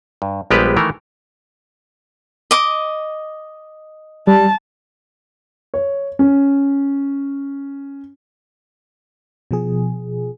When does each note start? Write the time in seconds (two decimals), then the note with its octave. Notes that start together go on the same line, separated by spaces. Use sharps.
0.22 G2
0.51 A#1 G3 G#3 B3 G4 B4
0.76 D#3 E3 A3 A#4
2.51 D#5 D6
4.27 G3 A5
5.74 C#5
6.19 C#4
9.51 B2 F3 G#4